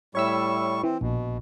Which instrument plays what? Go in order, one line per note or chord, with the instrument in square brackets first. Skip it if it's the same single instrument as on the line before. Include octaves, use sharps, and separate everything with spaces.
[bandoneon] A2 G3 C#6 [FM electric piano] C#5 E5 E6
[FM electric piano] E3 [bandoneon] C4
[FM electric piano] A#1 [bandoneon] B2